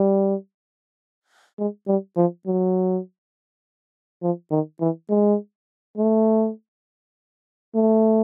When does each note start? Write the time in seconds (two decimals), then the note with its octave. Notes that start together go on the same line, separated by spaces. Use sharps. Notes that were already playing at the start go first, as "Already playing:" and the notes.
Already playing: G3
1.58 G#3
1.87 G3
2.17 F3
2.46 F#3
4.22 F3
4.51 D#3
4.80 E3
5.09 G#3
5.97 A3
7.75 A3